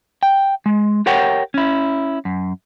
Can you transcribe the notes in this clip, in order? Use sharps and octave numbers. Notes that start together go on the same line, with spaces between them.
G5
G#3
G4 A#4 C#5 F#5 G5
C#4 E4
F#2